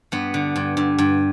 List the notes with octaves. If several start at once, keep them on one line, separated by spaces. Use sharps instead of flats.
G2 B3
D3
G2
G2
G2